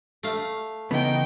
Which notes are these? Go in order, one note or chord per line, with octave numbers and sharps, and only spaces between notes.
A3 F5
C#3 E3 B3 D#4 G5